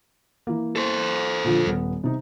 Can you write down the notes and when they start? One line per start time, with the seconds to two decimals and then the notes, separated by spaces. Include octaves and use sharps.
0.47 E3 A#3
0.76 A4 C5
1.44 A#2 D3 F3
1.66 D#1 B3
2.04 C3 D#4